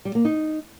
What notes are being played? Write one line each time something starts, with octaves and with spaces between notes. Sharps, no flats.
G3
A#3
D#4